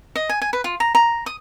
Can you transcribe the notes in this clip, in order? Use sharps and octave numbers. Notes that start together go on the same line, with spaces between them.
D#5
G#5
G#5
B4
F4
A#5
A#5
D#6